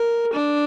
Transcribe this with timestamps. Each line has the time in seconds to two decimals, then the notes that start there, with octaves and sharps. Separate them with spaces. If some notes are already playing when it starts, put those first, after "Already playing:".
Already playing: A#4
0.33 D4